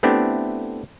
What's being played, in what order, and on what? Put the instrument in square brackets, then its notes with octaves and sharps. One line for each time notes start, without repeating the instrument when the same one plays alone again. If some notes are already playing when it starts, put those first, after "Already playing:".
[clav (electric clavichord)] A3 B3 C4 D4 E4 G4